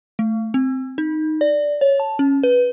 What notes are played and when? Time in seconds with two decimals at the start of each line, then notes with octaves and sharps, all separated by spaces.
0.19 A3
0.54 C4
0.98 D#4
1.41 D5
1.81 C#5
2.00 A5
2.19 C#4
2.43 B4